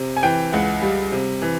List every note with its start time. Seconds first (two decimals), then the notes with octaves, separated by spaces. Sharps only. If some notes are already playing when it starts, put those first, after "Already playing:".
Already playing: C3
0.17 G#5
0.23 E3 G5
0.52 C#2 F#5
0.82 G3
1.12 C3
1.42 E3